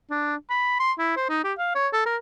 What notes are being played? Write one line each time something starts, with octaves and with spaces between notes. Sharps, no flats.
D4
B5
C6
E4
C5
D#4
G4
F5
C#5
A4
A#4